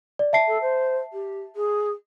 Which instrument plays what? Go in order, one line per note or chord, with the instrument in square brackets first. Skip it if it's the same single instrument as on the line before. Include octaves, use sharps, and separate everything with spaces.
[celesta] D5
E5 A5 C7
[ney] A4
C5
G4
G#4